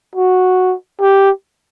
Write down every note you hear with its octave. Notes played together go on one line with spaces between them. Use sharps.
F#4
G4